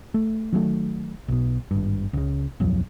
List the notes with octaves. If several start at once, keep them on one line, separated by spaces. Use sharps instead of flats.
A3
D#3 F#3 G3 A3
B1 B2
G#1 G2
C#2 C#3
D1 B1 F2 F#3